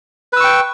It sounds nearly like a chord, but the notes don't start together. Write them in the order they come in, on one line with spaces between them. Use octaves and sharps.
B4 E6 C#6 G5